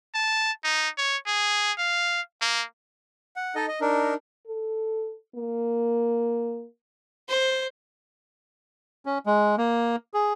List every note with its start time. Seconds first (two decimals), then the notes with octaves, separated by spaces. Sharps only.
0.15 A5
0.64 D#4
0.98 C#5
1.27 G#4
1.78 F5
2.41 A#3
3.36 F#5
3.55 D#4 A4 D#5
3.68 D#5
3.81 D4 D#4 A#4
4.47 A4
5.36 A#3
7.28 C5
9.06 C#4
9.26 G#3
9.58 A#3
10.14 G#4